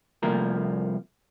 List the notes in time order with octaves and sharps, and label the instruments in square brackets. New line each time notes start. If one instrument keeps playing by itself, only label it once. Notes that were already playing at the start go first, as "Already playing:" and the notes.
[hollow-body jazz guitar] C2 F3 A3 A#3 A#4